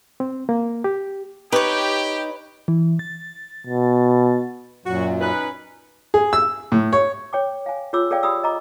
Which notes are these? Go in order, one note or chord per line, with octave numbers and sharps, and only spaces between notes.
C4
A#3
G4
D#4 G4 B4 C#5
E3
A6
B2
F#2 A#2 F#3 F#4
C#4 D#4 B4
G#4
E6
A2
C#5
C#5 G5 D6
F5 G#5
F4 G#4 C#5 D6 E6
G#4 A4 C#5 D5 F5 G5
G4 D5 B5 D#6 E6
D#5 A#5 D6